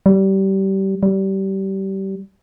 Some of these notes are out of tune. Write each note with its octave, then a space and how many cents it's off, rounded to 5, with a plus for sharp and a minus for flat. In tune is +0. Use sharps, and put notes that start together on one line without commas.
G3 -25
G3 -25